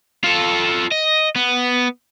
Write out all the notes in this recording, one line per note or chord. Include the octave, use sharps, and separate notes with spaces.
F4 A4
D#5
B3